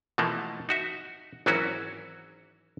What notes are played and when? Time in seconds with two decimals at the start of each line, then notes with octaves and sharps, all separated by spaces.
0.18 B2 E3 F3 A3 A#3
0.69 D#4 F#4 E5
1.46 G#1 E3 F#3 C#4 E4 F#4